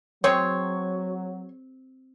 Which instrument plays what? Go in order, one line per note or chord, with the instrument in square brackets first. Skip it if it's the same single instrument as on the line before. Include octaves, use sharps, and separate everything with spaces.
[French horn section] F#3 [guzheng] C4 G#4 [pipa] C#5